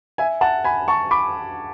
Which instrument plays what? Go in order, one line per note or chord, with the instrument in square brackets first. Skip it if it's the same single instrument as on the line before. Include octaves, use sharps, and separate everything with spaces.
[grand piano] E5 G#5
F#5 A5
G#5 B5
A5 C#6
B5 D6